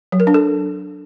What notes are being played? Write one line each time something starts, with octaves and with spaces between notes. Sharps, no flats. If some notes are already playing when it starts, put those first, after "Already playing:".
F#3
A#4
D4
A4